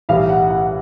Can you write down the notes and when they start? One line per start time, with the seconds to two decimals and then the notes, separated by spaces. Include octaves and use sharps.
0.09 B1 A2 E3 G3 F5
0.29 F#5
0.50 F#5